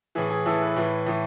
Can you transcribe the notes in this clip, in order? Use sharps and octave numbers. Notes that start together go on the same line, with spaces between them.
A2 E3 G#4
G#4
A2 E3 A4
B4
A2 E3
A2 E3